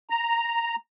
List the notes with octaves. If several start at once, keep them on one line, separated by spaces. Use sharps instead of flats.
A#5